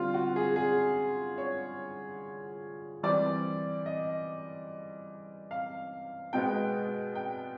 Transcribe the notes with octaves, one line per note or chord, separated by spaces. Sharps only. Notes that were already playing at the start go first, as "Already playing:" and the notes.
Already playing: D3 G3 C4 F4
F#4
G#4
G#4
C#5
E3 G3 C4 D5
D#5
F5
B2 G#3 B3 G5
G5